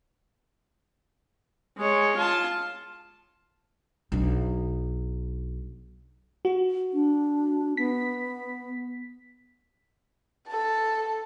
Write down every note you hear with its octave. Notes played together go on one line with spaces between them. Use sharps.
G#3 C#5
F4 A5
B1 D4
F#4
D4
B3 B6
A4 A5